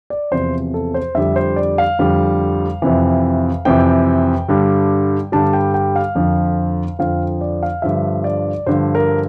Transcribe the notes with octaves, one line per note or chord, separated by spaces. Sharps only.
D5
E2 C3 F3 C5
A4
C5
F2 D3 G3 E5
C5
D5
F5
F2 D3 G3
F2 C3 E3
F2 C3 E3 G5
G2 D3 G3
G2 D3 G3 A5
G5
G5
F5
F2 D3 F3
F2 D3 F3 F5
D5
F5
G2 D3 F3 E5
D5
G2 D3 F3 C5
A#4